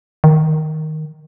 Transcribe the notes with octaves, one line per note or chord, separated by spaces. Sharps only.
D#3